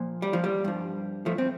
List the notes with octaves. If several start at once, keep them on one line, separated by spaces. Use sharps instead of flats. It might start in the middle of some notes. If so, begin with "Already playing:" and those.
Already playing: A#2 F3
G3
F3
G3
G2 F3
F3 A3
C4